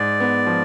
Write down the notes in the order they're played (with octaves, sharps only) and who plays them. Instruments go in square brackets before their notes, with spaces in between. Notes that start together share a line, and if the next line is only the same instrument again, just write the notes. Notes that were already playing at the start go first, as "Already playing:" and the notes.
Already playing: [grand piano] G#2 [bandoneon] D5
[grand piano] B3
F3